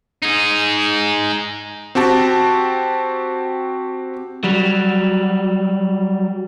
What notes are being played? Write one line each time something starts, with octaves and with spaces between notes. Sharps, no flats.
D#4 G#4
C4 F#4 G4 A5
F#3 G3